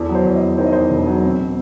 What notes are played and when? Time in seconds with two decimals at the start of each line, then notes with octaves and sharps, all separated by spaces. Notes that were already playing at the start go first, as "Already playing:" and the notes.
Already playing: E2 A4
0.09 F#3
0.15 C5
0.25 E2
0.36 D#5
0.42 E2
0.58 D#3 C5
0.66 D#5
0.72 E2 C5
0.91 E1
1.07 F#3
1.23 C4
1.39 B2